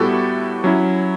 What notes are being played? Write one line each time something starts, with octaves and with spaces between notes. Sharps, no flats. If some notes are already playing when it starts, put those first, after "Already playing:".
Already playing: A2 G3 B3 E4 F#4 G4 A4
F#3 C#4 E4